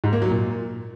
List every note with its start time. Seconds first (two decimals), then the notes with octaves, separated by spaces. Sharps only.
0.04 G#2
0.13 A#3
0.22 F#3
0.31 A#2